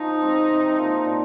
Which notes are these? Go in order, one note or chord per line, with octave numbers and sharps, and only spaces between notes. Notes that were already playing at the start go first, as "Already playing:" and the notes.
Already playing: F3 D#4
G#3 C4
C3
F3 A#3
A#2